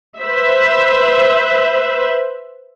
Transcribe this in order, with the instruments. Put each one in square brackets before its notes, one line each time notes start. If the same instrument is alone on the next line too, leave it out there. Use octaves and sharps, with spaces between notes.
[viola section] B4 C5 E5